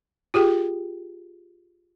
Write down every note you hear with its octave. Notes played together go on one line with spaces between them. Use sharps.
F4 G4 G#4 G5